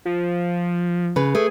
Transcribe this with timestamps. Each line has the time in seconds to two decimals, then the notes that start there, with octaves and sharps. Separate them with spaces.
0.05 F3
1.16 C#3 B4
1.35 A3 G#4